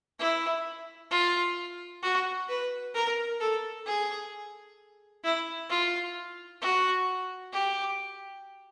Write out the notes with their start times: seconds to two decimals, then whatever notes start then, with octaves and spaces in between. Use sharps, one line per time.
0.19 E4
1.11 F4
2.03 F#4
2.49 B4
2.94 A#4
3.40 A4
3.86 G#4
5.24 E4
5.70 F4
6.61 F#4
7.53 G4